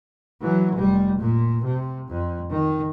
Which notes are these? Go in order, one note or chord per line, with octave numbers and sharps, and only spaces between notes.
E3 F#3
F1 G3
A#2
C3
F2
D#3